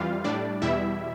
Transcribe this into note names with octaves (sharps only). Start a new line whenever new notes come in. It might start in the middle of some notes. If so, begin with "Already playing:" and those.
Already playing: F2 E3 G3 F4 F5
A2 G3 D4 D5
E2 B2 G3 E4 E5